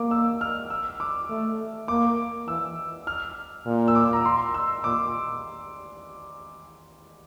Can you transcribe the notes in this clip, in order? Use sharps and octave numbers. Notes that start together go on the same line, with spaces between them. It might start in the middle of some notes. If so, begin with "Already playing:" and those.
Already playing: A#3 D6
E6
F6
E6
D6
A3
A#3 D6
E3 E6
F6
A#2
E6
D6
A#5
C6
E6
A#2 D6